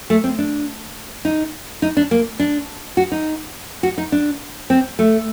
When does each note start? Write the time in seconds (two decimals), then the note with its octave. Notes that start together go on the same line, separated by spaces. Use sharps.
0.10 A3
0.24 C4
0.39 D4
1.25 D#4
1.82 D#4
1.97 D4
2.11 A#3
2.40 D4
2.97 F#4
3.12 D#4
3.83 F#4
3.98 D#4
4.12 D4
4.70 C4
4.99 A3